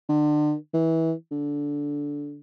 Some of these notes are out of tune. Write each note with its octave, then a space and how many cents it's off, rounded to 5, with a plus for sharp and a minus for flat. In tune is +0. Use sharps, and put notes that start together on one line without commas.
D3 +35
E3 -20
D3 -15